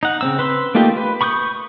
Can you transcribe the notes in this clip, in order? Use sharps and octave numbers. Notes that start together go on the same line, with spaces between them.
D#4 F#5
C#3 C4 E6
B4 C6 E6
A3 A#3 D#4 F4 G4
B4
B5 C#6 D#6 F#6 G6